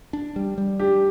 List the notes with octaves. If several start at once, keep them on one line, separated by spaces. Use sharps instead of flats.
D4
G3
G3
D4 G4